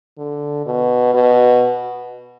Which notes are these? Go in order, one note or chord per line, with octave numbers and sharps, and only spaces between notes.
D3
B2
B2